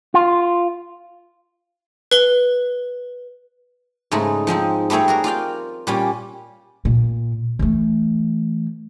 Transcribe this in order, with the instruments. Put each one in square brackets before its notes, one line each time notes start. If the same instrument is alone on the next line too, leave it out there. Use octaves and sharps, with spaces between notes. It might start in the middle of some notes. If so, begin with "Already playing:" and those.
[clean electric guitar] F4
[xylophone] B4 G7
[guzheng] G#2 C#3 G#3 A3 D#4
F3 G#3 C4 D#4
G3 A3 C4 G#4 C#5
F#4 G#4 A#4
F4 D5 F5 G5
A#2 G3 C#4
[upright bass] A#2
E3 A3